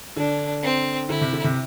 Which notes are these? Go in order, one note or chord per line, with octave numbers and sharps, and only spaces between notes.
D3 D4
C4
D3 E4
C3
D3
C3